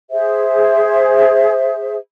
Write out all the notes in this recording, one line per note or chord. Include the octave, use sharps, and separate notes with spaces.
G#4 C5 E5